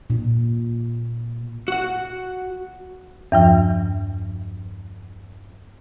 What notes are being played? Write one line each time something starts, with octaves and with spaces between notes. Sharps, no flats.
A#2
F#4 F#5
E2 G2 F3